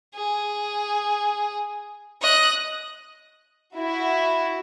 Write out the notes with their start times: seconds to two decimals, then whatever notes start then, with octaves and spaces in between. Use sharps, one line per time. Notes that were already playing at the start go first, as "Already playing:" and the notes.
0.15 G#4
2.22 D#5 F#6
3.76 E4 F#4